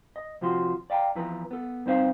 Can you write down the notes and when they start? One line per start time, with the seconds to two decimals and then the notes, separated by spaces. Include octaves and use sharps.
0.16 D#5
0.41 C3 F3 F4 F#4 C6
0.90 D5 F5 G5 A5 A#5
1.15 E2 F3 E4 B4 A#5
1.51 B3 A4
1.86 G2 C4 D#4 C5 F5